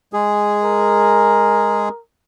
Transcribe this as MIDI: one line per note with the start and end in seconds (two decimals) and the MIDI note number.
0.13 1.89 56
0.13 1.89 68
0.64 2.00 70